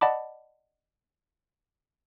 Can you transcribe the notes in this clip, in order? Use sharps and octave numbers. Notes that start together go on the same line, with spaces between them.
D5 D#5 F#5 A5 B5 D6